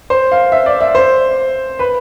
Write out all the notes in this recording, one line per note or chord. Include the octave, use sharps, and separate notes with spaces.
C5
F5
E5
D5
E5
C5
B4